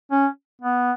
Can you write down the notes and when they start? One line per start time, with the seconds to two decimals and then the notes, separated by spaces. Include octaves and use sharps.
0.11 C#4
0.62 B3